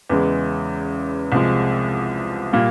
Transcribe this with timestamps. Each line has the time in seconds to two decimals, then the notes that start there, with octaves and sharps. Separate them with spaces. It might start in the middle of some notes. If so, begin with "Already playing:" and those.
0.10 E2 C#3 E3 G#3
1.32 C2 C3 F3 G#3
2.53 A#2 G3 A#3